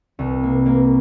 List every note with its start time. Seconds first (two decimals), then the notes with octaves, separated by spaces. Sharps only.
0.19 C2
0.43 A#3
0.66 A#3